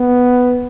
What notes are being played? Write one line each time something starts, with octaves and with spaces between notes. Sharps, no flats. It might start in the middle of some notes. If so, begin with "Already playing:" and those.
Already playing: B3